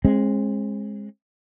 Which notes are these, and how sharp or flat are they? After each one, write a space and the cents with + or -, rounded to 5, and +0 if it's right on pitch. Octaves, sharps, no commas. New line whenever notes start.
G#3 +0 C4 +45